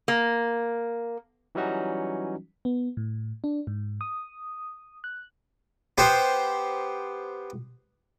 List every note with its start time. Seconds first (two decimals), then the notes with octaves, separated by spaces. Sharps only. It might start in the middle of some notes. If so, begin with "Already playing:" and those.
0.08 A#3
1.55 E3 F#3 G3 C#4 D#4 F#4
2.65 B3
2.97 A2
3.44 D4
3.67 G#2
4.01 D#6
5.04 F#6
5.98 B3 G4 C5